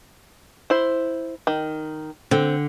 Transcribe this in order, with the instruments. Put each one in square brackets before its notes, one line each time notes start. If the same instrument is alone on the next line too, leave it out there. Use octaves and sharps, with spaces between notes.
[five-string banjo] E4 C5
D#3
[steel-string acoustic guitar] D3 [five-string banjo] C4